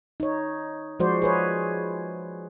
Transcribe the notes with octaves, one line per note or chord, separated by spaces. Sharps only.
D#4 C#5
F3 G#3 F#4 C5 D5
G#4 B4 C#5